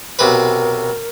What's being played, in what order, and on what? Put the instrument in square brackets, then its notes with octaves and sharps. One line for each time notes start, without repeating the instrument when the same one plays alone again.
[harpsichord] B1 C3 B4 [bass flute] A#4